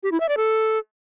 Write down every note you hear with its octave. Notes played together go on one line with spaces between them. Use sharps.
G4
E4
E5
D5
A4